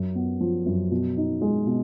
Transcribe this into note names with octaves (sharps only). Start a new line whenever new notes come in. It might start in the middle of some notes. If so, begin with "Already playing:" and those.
Already playing: F#2
B3
F3
F#2
B2
D#4
G#3
B2